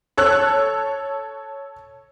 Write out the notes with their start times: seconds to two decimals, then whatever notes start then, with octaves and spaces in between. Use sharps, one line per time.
0.17 A4 C#5 E6 F#6